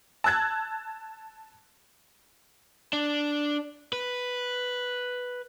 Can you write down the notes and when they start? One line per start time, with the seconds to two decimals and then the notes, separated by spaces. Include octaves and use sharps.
0.24 A5 E6 F#6 G#6 A6
2.93 D4
3.93 B4